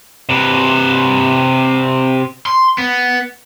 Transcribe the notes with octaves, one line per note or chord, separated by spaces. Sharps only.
C3 B4
C6
B3